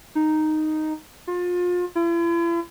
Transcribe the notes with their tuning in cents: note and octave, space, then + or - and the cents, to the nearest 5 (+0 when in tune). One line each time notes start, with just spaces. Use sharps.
D#4 -5
F4 +30
E4 +45